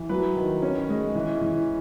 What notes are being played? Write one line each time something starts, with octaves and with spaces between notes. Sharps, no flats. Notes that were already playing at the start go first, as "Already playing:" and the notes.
Already playing: E3
F#3 B4
D#3
C#4
G#3
E3
E3